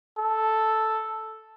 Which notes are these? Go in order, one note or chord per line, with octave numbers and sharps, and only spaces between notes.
A4